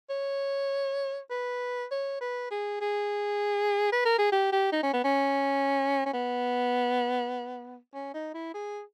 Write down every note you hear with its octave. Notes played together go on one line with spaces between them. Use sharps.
C#5
B4
C#5
B4
G#4
G#4
B4
A#4
G#4
G4
G4
D#4
C#4
B3
C#4
C#4
B3
C#4
D#4
E4
G#4